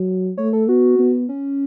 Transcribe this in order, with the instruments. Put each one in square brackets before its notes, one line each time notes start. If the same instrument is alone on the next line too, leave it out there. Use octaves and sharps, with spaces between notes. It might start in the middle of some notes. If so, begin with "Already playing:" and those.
Already playing: [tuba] F#3
[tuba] A3 [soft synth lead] C#5
[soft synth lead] A4
[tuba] B3 [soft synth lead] F#4
[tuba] B3
[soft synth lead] C#4